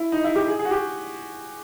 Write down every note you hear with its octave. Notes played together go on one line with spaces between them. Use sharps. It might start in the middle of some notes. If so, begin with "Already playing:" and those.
Already playing: E4
D#4
E4
G4
G#4
G#4
F#4
G4